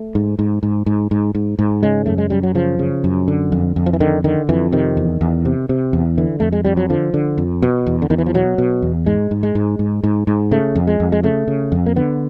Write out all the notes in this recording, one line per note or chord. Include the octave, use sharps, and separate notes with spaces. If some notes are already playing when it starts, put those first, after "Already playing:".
Already playing: A3
G#2
G#2
G#2
G#2
G#2
G#2
G#2
C#3 G#3
F#2 A3
G#3
F#2 G3
F#3
C#3 F3
C#3
F#2
D3
F2
F2
F3
E3
D3 D#3
D3 D#3
F2 E3
C3 D#3
E2
E2
C3
C3
E2
D3 E3
F2 A3
G#3
F2 G3
F#3
D3 F3
D3
F2
B2
E2
D3
E2 D#3
E3
F3
B2 F#3
B2
E2
G#2 G#3
G#2
G#3
G#2
G#2
G#2
G#2
C#3 A3
F2
G#3
F2
G#3
C#3 A3
C#3
F2
A#3
D3 B3